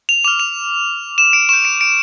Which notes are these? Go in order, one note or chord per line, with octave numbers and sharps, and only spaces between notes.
F7
D6 F6 F7
F7
E7
D7
C#6 G6 E7
D7
D7